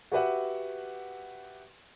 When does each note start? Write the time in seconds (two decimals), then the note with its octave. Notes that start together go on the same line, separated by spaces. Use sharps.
0.12 F#4 G4 B4 E5 F#5